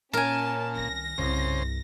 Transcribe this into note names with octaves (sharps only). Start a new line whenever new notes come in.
A#2 C#4 A#4 G#5 A5
C2 D#3 A#6
C2 G2 C#3 C5